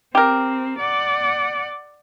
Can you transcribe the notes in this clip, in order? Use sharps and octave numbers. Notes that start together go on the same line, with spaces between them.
C4 G4 A#4
D5 F#5